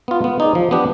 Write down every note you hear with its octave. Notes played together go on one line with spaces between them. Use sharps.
B3 F4
B3
D#4 G#4 D5
F3
B3 D4 G4